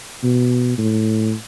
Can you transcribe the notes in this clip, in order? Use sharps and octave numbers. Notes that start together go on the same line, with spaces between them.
B2
A2